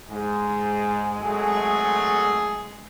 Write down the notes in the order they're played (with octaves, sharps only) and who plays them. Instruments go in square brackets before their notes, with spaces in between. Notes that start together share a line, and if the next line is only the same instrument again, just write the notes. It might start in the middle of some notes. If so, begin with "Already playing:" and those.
[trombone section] G#2 [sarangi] G#3
[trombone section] G#1 F#3 A3 [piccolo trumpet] G#4